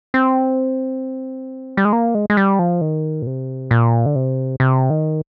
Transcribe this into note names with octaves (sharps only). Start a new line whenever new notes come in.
C4
G3
G#3
A#3
G#3
G#3
G3
F3
D#3
A#2
C3
A#2
D3
C3
C3
D#3